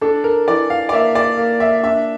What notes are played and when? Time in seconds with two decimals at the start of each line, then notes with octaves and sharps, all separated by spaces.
0.01 D4 A4
0.24 A#4
0.48 E3 D5
0.70 F5
0.89 D5
0.92 A#3 E5
1.15 D5
1.38 A#3
1.60 E5
1.83 D4 E5